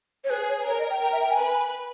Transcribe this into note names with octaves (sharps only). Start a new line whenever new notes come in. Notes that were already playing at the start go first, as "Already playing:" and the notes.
C#5
G#4 B4
C#5
A#4 C#5
D#5
G5
A#4 G5
E5
G5
G#5
B4